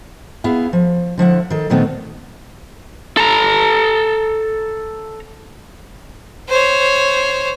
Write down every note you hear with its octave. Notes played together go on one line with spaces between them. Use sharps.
B3 E4 G#4 F5
F3
D3 F3 E4 F#5
D#3 A4
A#2 D#3 A3 B3 C4
A4 A#5
C5 C#5